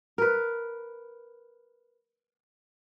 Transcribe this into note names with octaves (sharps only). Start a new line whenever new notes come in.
A#4 B4